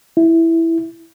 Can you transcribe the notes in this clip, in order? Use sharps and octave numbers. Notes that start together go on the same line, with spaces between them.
E4